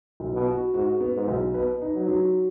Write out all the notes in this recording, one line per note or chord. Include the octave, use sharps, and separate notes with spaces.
B1
B2
F#4
G#2 F#4
B3
G#2
B1
B2 B4
D#4
F#3
F#3